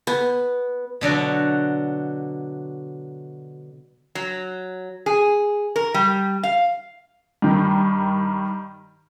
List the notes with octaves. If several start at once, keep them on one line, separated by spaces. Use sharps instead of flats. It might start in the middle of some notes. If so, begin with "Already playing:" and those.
B3
B2 D3 F#3 F#4
F#3
G#4
A#4
G3
F5
G2 D#3